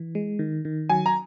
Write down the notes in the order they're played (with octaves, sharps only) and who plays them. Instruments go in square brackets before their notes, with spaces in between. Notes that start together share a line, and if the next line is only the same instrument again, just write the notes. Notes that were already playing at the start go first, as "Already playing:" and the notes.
Already playing: [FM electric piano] E3
G#3
D#3
D#3
[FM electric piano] F#3 [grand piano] G#5
[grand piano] A#5